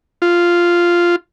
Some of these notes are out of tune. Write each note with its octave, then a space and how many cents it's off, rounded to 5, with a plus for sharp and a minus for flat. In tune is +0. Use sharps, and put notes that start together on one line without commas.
F4 -5